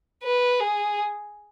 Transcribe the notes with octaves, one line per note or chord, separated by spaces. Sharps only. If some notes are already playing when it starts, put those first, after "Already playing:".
B4
G#4